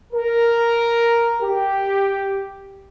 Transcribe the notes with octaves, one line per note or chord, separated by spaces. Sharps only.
A#4
G4